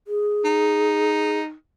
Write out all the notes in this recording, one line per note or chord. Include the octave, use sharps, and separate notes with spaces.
G#4
D#4